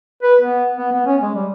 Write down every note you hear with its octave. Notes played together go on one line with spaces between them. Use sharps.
B4
B3
B3
B3
C#4
G#3
G3